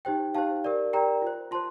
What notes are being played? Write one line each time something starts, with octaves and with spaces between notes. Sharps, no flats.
D#4 G4 C5 G5
D#4 G4 C5 F5 A5
G4 A#4 D5
G4 A#4 D5 G5 A#5
F4 C5
F4 C5 A5 C6